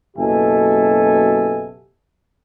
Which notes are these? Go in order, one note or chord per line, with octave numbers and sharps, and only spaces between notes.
F#1 B2 G4 A4 E5 G#5